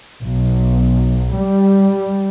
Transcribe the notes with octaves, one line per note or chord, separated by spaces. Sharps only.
B1
G3